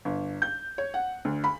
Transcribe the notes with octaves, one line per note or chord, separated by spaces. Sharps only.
G1
G6
C#5
F#5
D2
B5